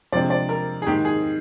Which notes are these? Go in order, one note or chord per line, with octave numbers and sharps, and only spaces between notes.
C3 F3 G#3 D4 D5
D5
A#4
G#4
G#2 D#3 A#3 G4
G#4